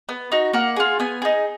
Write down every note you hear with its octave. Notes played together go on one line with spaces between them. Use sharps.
B3
D#4 F#4
A#3 F#5
F4 G#4
B3 G#5
D#4 G#4